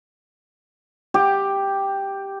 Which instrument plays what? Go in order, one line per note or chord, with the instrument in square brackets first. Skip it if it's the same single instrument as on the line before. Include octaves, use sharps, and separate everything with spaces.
[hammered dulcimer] G4